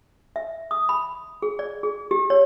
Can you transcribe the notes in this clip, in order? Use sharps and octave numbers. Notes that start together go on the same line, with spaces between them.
E5
D#6
B5
G#4
D5
G#4
G4
C#5